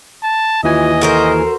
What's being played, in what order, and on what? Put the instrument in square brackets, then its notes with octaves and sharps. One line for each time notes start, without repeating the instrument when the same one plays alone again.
[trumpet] A5
[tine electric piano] D#2 E3 G#5 [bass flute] F4 [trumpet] D#5
[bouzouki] F#4 A#4 C5 [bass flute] A4